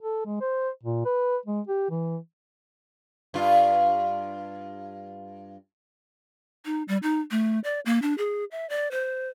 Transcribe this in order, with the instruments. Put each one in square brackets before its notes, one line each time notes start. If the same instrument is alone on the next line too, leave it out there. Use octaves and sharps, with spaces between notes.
[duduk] A4
G#3
C5
A#2
B4
G#3
G4
E3
[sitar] G2 F4
[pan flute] D#4
G3
D#4
A3
D5
A#3
D4
G#4
E5
D5
C5